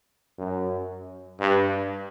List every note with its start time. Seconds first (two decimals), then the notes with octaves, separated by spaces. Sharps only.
0.39 F#2
1.40 G2